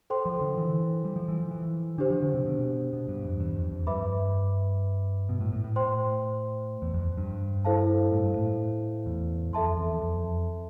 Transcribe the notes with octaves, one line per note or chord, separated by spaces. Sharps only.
A4 C5 G5 C6
F3
D3
E3
G3
F3
E3
F3
E3
D3 D4 G4 C5
F3
D3
C3
B2
B2
G2
F2
E2
F2
F2
G2 B4 E5 B5 D6
B2
A2
A2
A2
C5 G5 C6
E2
F2
G2
E4 A4 C5 F5 A5
A2
G2
A2
E2
F2 A4 E5 A5 C6
E2
F2